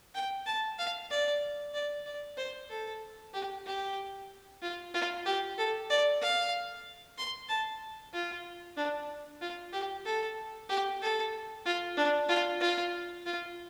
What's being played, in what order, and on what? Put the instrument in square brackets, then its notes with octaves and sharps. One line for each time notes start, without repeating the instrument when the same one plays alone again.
[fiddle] G5
A5
F5
D5
D5
D5
C5
A4
G4
G4
F4
F4
G4
A4
D5
F5
C6
A5
F4
D4
F4
G4
A4
G4
A4
F4
D4
F4
F4
F4